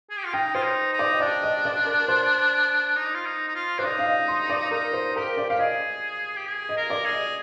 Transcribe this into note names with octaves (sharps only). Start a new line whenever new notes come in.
G#4
G4
F4
D#4 G5
F4 C5
D#4
D#4
D5
D#5
D4 D5
D#5
D5
A#4
C5
D#4
F4
D#4
D#4
F4
D4 C5
D#4 D5
F5
D#5
C6
D5
D#4 A#4
C5
G4 A#4
D5
G4 F5
G#4 D#5
G4
G#4
D#5
A#4
D5
G#4
D#5